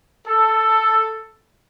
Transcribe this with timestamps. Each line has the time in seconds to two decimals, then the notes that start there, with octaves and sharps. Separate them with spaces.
0.27 A4